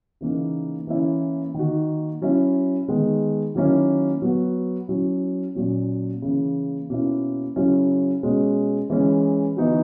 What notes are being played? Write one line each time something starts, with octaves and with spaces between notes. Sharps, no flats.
C#3 E3 A#3 D#4
E3 A#3 C#4 E4
D#3 A#3 D#4 F#4
F#3 C#4 E4
D#3 G#3 B3
D#3 F#3 A#3 C#4 E4
F#3 B3 F#4
F#3 C#4 E4
A#2 F#3 C#4
C#3 E3 A#3
B2 A#3 C#4 E4
C#3 F#3 C#4 E4
B2 G#3 C#4 F#4
E3 G#3 C#4
E3 B3 D#4 F#4